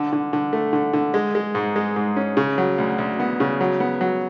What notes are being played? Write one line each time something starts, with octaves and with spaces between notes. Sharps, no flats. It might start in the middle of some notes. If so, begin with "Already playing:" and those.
Already playing: D3
D3
D3
A3
D3
D3
G#3
G#3
G#2
G#3
G#2
C#4
C#3
F#3
D2
D2
B3
C#3
F#3
B3
F#3